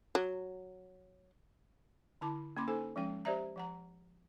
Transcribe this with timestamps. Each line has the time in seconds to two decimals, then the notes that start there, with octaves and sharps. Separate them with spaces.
0.15 F#3
2.21 D3 E4 A5 B5 D6
2.57 A#3 C#4 B5 C6 D6
2.68 D#4 A4 C5 G#5
2.96 F3 G#3 C#4 G5
3.25 G4 C5 D5 E5 A#5
3.56 F3 F#5 A#5